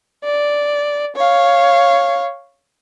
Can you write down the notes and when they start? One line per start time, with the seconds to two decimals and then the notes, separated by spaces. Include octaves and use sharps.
0.24 D5
1.16 C#5 F5